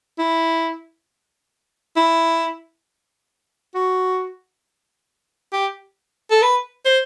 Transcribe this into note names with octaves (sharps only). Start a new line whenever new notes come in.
E4
E4
F#4
G4
A4
B4
C5